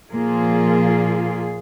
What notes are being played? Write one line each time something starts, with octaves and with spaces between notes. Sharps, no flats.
A#2 F3 A#3 F4 G#4